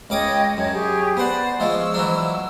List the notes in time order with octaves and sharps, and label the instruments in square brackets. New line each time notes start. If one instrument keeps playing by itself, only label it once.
[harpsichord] C#2 D6 D#6 [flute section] C#5 D#5 G5
[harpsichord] F#2 [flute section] C#5 G#6
[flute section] G4 G#4 C#6
[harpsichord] B3 F#5 [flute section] C5 D5
[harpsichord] F3 G#3 [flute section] C#6 E6
[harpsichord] E3 F#3 D4